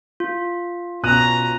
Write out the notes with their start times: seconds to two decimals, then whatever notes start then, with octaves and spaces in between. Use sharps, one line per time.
0.20 F4
1.03 B2 C#4 A#5 F#6 D#7